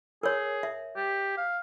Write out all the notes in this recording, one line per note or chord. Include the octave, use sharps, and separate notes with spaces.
G#4 A#4 C#5
E5
G4
F5